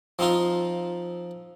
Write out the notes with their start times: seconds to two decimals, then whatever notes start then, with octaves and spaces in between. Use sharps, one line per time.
0.19 F3 C4 D#4 F4